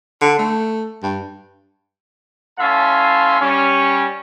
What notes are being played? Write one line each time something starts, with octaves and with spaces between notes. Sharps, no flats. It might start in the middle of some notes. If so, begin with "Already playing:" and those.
D3
A3
G2
A2 C#4 E5 F5 A5 C6
G3 C#4